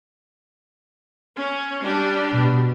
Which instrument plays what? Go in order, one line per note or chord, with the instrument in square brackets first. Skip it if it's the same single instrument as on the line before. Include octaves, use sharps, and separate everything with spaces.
[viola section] C#4
G3 D4 G4
[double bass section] B2